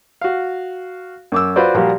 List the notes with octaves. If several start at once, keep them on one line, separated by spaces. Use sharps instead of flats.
F#4 F5
F#2 D6 E6
F4 F#4 B4 C5 D5
A#2 F3 G3 F#4 G4